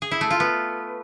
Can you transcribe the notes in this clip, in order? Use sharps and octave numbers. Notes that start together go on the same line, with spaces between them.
G#4
E4
A3
F4
B3